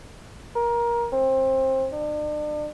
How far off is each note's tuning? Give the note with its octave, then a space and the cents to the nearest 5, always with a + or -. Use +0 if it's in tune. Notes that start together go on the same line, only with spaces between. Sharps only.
A#4 +20
C4 +20
D4 +40